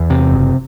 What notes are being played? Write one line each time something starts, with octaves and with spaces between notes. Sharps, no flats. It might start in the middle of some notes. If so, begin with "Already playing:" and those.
Already playing: E2
C3
F#1